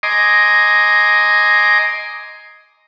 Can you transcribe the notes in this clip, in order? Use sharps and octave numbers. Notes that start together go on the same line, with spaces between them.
D#5 G#5 A#5 C6 D6